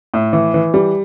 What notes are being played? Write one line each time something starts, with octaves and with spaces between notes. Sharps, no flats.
A2
E3
E3
G3